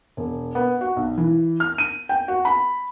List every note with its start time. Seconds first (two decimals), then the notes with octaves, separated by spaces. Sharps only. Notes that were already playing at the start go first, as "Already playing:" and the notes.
0.17 E1
0.55 B3
0.81 F#4
0.96 B1
1.17 E3
1.60 F6
1.78 D#7
2.09 G5
2.28 F#4
2.45 B5